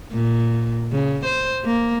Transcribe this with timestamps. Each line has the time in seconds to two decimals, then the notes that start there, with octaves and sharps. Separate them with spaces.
0.12 A#2
0.92 C#3
1.25 C5
1.65 A#3